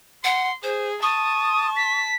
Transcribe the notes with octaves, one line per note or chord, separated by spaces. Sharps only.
F#5 C6
G#4 C5
A5 C#6 D#6
B6